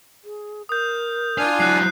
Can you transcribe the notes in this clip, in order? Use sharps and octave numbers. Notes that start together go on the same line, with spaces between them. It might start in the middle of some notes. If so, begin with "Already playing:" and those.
G#4
A#4 D#6 G6
D4 F4 F5 G#5
F#3 E4 F4 F#6 C7